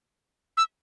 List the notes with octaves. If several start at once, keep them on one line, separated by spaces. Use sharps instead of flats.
E6